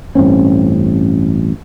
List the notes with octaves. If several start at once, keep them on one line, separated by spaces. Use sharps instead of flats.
A1 G2 C4 C#4